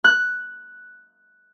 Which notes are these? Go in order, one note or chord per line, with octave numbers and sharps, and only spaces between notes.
F#6